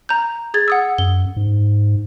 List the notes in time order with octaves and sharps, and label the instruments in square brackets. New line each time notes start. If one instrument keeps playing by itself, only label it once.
[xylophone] A#5 G6
G#4 G#6 A6
F#5 D#6 E6
[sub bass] F#2 [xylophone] G7
[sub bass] G#2